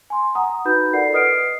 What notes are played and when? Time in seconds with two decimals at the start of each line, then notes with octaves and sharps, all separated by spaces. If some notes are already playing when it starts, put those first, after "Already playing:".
0.10 G#5 C6
0.35 F#5 A#5 D#6
0.65 D#4 F#4 B4 B5 G6
0.93 F4 A4 A#4 D5 F#5 C7
1.13 B4 D#5 D#6 F6 C7 D7